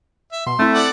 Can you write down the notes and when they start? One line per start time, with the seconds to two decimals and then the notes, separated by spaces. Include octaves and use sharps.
0.32 E5
0.46 B2 C6
0.59 A3 C4 E4
0.74 A4 D5 F#5